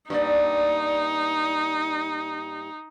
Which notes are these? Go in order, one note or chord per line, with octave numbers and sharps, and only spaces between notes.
G2 A#3 D#4 D5